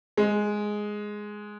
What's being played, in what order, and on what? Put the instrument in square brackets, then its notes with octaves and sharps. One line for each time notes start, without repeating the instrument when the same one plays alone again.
[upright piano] G#3